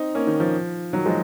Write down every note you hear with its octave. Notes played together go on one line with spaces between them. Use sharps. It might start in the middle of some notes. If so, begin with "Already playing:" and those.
Already playing: C4 D#4
A#3 C#4
D#3
F3
D#3 F#3
F3 G#3